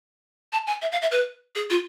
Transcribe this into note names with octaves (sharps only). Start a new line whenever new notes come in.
A5
G#5
E5
F5
E5
B4
G#4
F4